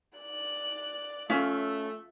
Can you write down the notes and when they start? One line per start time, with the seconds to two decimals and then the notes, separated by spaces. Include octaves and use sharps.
0.19 D5 F#6
1.30 A3 C#4 F4 E5 F5